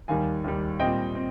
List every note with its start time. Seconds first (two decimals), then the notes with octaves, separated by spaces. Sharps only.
0.08 D#2 D#3 G3 F5 G#5
0.44 D#2 D#3 G3
0.80 A#2 G3 C4 D#5 G5
1.15 C4